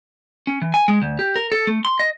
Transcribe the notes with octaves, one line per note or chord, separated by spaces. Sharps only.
C#4
E3
G#5
G#3
D2
G4
A#4
A4
A3
C6
D#5